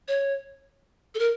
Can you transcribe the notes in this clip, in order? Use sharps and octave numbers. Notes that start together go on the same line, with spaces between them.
C#5
A4
A#4